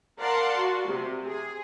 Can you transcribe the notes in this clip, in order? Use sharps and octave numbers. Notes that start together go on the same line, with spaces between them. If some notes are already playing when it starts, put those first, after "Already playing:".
A#4 D5 F5 F#5 A5 C6
F#4
C3
G#4